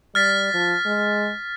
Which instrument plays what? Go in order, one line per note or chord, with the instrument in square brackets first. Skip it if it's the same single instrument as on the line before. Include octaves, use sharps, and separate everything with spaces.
[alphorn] G3 [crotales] F6 A6 B6
[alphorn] F3
G#3